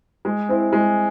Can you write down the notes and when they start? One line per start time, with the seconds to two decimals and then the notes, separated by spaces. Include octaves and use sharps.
0.25 G#3
0.49 C4 E4
0.73 G#3